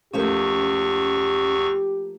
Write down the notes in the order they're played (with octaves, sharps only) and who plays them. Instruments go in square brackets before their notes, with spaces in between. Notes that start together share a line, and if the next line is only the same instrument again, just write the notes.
[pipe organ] E2 C#6 [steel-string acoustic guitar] F3 A3 A#3 [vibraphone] C#4 [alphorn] G4